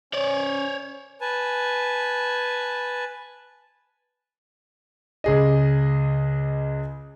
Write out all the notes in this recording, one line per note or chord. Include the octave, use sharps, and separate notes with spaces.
C#4 C#5 D5
B4 G#5 A5
C#2 G#4 D#5